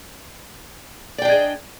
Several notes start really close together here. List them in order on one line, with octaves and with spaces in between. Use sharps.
D5 G5 D4 D#5 G#4